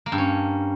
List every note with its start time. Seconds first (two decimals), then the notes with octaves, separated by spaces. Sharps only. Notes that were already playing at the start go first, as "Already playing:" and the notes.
0.06 A#3
0.12 G2
0.18 C#4